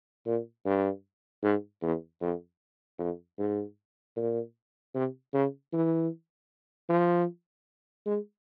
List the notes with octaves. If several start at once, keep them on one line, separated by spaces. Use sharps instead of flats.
A#2
G2
G#2
E2
F2
F2
G#2
A#2
C3
C#3
E3
F3
G#3